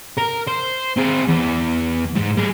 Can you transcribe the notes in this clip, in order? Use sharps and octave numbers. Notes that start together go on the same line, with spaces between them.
A#4
C5
C4 G#4
E2
G#2 G#3
G3 G#4